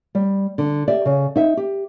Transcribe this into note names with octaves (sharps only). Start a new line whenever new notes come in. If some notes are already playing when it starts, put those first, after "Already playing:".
G3
D3
G4 D5 E5
C#3
D#4 E5
G4